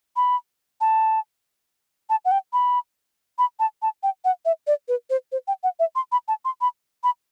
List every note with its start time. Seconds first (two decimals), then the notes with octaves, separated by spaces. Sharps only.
0.16 B5
0.81 A5
2.10 A5
2.25 F#5
2.31 G5
2.53 B5
3.38 B5
3.60 A5
3.82 A5
4.03 G5
4.25 F#5
4.45 E5
4.67 D5
4.88 B4
5.10 C5
5.32 C5
5.48 G5
5.63 F#5
5.79 E5
5.96 C6
6.12 B5
6.28 A5
6.45 C6
6.61 B5
7.04 B5